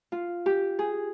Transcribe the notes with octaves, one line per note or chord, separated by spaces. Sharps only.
F4
G4
G#4